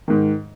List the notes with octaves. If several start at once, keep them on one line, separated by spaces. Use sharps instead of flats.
G#2 D#3